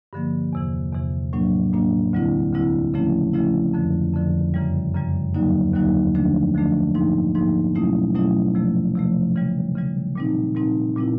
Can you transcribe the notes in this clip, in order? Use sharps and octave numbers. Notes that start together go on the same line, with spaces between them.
G2 D3 F3 A#3
E2 C3 E3
E2 C3 E3
A2 F#3 A#3 D4
A2 F#3 A#3 D4
D2 D3 G3 C4 E4
D2 D3 G3 C4 E4
C#3 F3 A3 C#4 E4
C#3 F3 A3 C#4 E4
F2 D3 F3
F2 D3 F3
F#2 C#3 E3 G3
F#2 C#3 E3 G3
D#2 D3 F#3 A#3 D#4
D#2 D3 F#3 A#3 D#4
D3 F3 A3 D4
D3 F3 A3 D4
G#2 F3 A#3 D#4
G#2 F3 A#3 D#4
B2 F#3 A3 C#4 E4
B2 F#3 A3 C#4 E4
C3 F3 A3
C3 F3 A3
C#3 E3 G3
C#3 E3 G3
A#2 G3 C4 D#4
A#2 G3 C4 D#4
A#2 G3 C4 E4